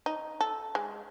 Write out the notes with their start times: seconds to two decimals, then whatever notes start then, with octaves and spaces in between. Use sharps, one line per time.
0.06 D#4
0.41 A4
0.75 G#3